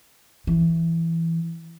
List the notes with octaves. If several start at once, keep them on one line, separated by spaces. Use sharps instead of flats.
E3